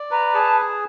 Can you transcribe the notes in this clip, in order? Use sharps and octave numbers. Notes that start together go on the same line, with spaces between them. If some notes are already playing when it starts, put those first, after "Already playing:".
Already playing: D5
B4 A#5
G#4 A5